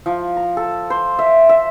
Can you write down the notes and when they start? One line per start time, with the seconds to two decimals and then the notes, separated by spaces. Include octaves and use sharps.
0.06 F3
0.37 A#5
0.57 A4
0.90 C5
1.19 E5
1.49 E5